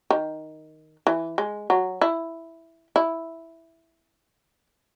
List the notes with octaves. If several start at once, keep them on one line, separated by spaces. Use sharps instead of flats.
D#3
E3
G#3
F#3
E4
E4